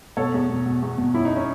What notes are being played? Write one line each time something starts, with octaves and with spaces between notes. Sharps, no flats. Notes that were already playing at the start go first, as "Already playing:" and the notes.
B2 A4 C#5
E2
B2
B2
E2
B2
F#2 E4
D#4
C#4